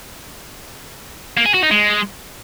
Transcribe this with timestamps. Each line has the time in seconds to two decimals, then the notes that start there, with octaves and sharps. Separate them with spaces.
1.37 A#3
1.46 G#4
1.54 F#4
1.63 D#4
1.71 G#3